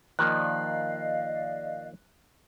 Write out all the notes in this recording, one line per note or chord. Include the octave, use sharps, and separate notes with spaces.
D#3 F3 A#3 D5 D#5 F5 F#6